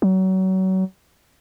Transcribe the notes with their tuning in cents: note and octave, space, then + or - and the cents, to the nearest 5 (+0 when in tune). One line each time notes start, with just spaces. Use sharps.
F#3 +30